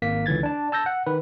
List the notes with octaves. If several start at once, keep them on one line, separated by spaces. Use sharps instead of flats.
G#1 A#3 B6
C#2 D3 E3 G#6 A6
D4 A5
A5 E6 G6 A#6
F#5
D#3 B4